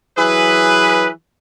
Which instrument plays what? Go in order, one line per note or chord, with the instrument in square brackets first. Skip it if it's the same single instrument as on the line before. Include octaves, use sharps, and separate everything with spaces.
[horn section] E3 F#3 G#4 B4